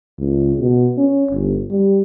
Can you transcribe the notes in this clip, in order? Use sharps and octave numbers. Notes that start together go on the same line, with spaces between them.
C#2
B2
C#4
G1
G3